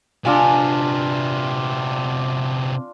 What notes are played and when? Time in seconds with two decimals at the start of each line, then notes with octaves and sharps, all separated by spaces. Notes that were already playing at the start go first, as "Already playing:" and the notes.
0.25 C3 B3 D4 F4 G#5